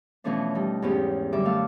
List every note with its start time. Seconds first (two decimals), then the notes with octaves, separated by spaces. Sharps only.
0.24 B2 E3 F3 A3 C#4 D4
0.55 G3 D#4
0.82 E2 G#2 B3 C#4 G4
1.33 F#2 D3 G3 E5 D6
1.45 A3 B3 F5 E6